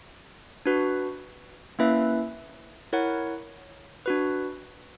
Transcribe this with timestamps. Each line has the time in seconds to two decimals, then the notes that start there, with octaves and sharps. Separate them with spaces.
0.66 D4 F#4 B4
1.79 A#3 C#4 E4 B4 E5
2.92 E4 A#4 C#5 F#5
4.06 D4 F#4 B4